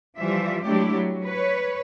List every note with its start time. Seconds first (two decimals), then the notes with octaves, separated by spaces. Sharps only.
0.19 E3 F3 G3 F4 E5
0.65 F#3 G#3 A3 D4 E4 G4
0.94 F#3
1.25 B4 C#5